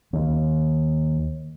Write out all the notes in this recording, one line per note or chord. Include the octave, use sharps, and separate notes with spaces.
D#2